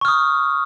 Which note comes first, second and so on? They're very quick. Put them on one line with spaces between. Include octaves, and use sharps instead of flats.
C#6 F6 D#6